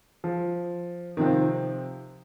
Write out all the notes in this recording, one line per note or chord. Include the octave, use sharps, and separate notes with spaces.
F3
C3 D#3 F3 C4